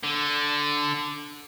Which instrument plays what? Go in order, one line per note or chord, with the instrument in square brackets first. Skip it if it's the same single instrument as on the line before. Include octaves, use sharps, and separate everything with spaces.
[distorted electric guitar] D3